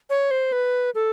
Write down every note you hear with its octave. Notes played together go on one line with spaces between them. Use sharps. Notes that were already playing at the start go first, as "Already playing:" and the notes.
C#5
C5
B4
A4